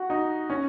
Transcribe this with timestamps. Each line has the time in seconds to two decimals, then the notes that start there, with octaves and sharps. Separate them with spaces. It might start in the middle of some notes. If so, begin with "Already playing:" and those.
Already playing: F#4
0.10 D#4
0.50 C#4